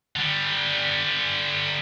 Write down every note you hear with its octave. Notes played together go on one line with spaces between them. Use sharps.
D3 G3